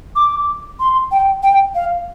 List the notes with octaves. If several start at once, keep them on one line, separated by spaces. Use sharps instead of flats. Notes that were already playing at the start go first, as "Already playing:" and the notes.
D6
C6
G5
G5
F5